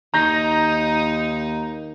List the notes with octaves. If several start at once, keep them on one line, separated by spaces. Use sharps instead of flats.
D#2 D#4 A#5 G6 A#6